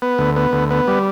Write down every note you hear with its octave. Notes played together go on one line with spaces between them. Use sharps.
B3
D2
B3
D2
B3
G3